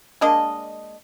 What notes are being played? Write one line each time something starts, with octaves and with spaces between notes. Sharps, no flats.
G#3 A#3 D4 D#5